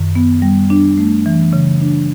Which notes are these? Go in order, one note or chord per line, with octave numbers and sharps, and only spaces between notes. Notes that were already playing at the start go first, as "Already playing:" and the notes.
Already playing: F#2 D#3
B3
G3
D4
A3
E3
C#3
D4